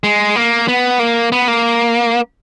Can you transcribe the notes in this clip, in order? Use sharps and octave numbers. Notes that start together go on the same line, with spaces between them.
G#3
A#3
B3
A#3
B3
A#3